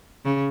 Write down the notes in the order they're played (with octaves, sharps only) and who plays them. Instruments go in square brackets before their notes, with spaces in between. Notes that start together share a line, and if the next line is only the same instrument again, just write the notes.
[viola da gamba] C#3